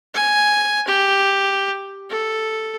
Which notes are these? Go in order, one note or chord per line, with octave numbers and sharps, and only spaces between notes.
G#5
G4
A4